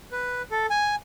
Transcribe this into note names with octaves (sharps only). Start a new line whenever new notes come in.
B4
A4
G#5